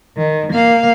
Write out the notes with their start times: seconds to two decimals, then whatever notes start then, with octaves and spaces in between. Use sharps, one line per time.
0.17 D#3
0.53 A#3 F5